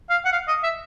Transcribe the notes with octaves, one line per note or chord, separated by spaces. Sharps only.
F5
F#5
F5
D#5
E5